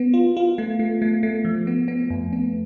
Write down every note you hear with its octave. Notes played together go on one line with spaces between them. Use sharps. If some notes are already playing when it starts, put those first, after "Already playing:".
Already playing: B3
F4
F4
A3
A3
A3
A3
F3
B3
B3
F2
B3